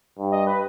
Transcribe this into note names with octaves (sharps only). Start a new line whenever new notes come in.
G2
D#5
B4